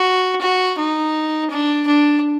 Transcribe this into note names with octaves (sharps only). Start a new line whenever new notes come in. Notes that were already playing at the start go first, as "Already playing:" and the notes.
Already playing: F#4
F#4
D#4
D4
D4